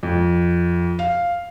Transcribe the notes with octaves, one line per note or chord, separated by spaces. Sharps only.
F2
F5